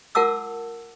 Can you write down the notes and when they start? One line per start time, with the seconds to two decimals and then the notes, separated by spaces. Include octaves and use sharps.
0.15 F4 A#4 F#5 A5 D6 E6